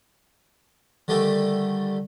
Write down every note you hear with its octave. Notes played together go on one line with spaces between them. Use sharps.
D3 D#3 G3 A3 G4 A4